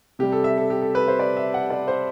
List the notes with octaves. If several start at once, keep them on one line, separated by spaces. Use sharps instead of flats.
C3 G3 G4
A4
E5
A4
G4
A4
B4
C5
D5
E5
F#5
D5
C5